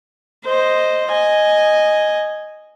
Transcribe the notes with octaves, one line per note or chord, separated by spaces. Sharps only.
C5 D#5
D#5 G#5